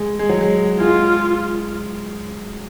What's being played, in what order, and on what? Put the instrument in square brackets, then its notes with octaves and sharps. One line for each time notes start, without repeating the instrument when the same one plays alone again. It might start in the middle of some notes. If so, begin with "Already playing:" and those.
Already playing: [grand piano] G#3
G#3
F#3
G#3
[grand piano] G#3 [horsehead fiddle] F4